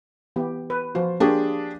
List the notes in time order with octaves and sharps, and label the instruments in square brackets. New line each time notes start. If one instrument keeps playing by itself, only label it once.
[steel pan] E3 B3 G4
B4
[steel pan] F3 F4 F#4 [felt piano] C5
[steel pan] A#3 F4 C#5 [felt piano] D4 G4 G#4